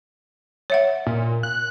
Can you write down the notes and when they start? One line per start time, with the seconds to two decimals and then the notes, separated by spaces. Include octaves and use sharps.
0.70 C#5 E5 F#5
1.07 A#2
1.43 F#6